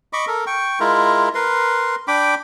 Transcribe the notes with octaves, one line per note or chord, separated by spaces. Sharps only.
D#5 B5 C#6 D6
A4 A#4
G5 C#6
G#3 E4 F4 A#4
A#4 B4 C6
D4 G5 B5 D6